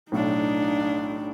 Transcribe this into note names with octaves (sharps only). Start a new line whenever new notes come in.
B1 A2 D4 D#4